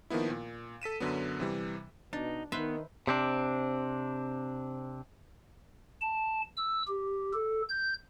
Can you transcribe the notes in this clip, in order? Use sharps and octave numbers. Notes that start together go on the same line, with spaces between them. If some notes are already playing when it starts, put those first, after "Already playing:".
D#3 F3 A#3 B3 E4
A#2
A4 B6 D#7 E7
F#2 D3 F#3 B3
C3 E3 G3
B2 D4 D#4
D#3 B3 D#4 B4 C5 E5
C3 C4 D4
A5
E6
G4
A4
G6